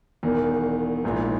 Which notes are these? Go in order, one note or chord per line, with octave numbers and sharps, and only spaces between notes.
E1 E2 D#3
A#1 G#2 E3